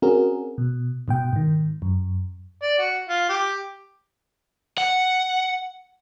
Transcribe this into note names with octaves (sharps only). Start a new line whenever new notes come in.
C4 C#4 F#4 G#4 A#4
B2
G#2 B2 G5
G#2 D#3
F#2
D5
F#4
F4
G4
F#5